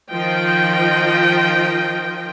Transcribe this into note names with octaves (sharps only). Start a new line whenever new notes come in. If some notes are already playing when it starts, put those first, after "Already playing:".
D#3 F3 F4 D#5 G5